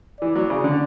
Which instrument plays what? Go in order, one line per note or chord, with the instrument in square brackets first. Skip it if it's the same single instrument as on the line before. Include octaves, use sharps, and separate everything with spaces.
[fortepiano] E3 [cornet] D5
[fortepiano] F#3
C#3
D3